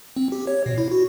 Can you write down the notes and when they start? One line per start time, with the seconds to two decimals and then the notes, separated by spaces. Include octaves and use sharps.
0.17 C4
0.32 G4
0.47 C#5
0.66 B2
0.78 E4
0.92 F#4